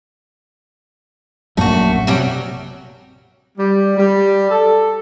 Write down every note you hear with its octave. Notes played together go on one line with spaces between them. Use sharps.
A#1 F#2 A#2 A3 F#4
C3 F#3 G3 G4
G3
G3
A4